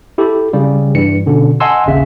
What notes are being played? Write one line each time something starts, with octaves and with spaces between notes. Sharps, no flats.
E4 G4 A4
C#3 G3
G2 E3 C#7
B2 D3 C#4
D#5 F#5 G#5 A5 C6 E6
A1 D#2 C#3 E5